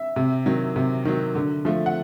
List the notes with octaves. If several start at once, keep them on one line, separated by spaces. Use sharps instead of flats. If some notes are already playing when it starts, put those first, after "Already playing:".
Already playing: E5
C3
D#3 F#3
C3
D#3 F#3
D3
F3 A3
F#5